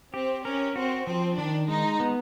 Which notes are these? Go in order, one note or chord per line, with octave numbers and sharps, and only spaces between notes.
C4 G4
C#4 A#4
C4 F#4
F3 C4
D#3 D4
G#3 D#4
B3